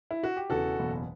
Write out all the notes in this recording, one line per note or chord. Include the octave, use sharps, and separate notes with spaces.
E4
F#4
G4
E1 E2 C#3 E3 F#4 A4
F#1 E2 B2